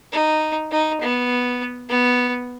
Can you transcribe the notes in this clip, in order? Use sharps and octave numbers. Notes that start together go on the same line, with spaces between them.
D#4
D#4
B3
B3